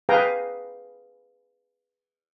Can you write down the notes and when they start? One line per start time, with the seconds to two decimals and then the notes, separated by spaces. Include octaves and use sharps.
0.09 G#4 B4 F5 G5 G#5 A#5